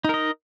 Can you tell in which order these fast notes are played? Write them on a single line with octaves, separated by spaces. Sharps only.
D#4 A#4 D#5